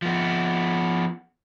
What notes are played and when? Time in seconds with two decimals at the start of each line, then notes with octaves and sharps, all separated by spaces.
0.02 F3 B3